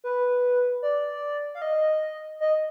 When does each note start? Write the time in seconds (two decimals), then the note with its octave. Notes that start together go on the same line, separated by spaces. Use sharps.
0.04 B4
0.82 D5
1.55 F5
1.62 D#5
2.40 D#5